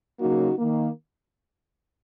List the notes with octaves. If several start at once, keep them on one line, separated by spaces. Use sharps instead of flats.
C#3 F#3 A#3 D#4 F#4
D#3 A#3